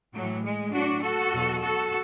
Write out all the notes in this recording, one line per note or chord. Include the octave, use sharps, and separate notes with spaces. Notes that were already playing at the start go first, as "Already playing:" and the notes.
A2 E3 F#3
G#3
A2 F#3 D4 F#4
F#4 A4
E2 B2 F#3
F#4 A4